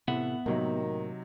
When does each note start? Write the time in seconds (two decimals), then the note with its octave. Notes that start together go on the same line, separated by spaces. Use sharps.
0.08 A2 C3 E3 B3 E5 F#5
0.46 A2 C3 D#3 F#3 A#3 D#4